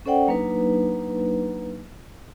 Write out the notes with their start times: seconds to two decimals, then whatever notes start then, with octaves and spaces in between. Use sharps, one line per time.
0.06 C#4 A4 C5 D5 F#5 G5
0.28 F#3 A#3 D4 D#4 B4